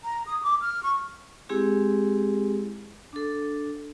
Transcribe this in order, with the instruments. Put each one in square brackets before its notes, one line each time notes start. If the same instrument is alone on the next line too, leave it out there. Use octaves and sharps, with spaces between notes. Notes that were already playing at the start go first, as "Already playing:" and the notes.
[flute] A#5
D#6
D6
F6
C#6
[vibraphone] G#3 C4 E4 G4 G#4
D4 A4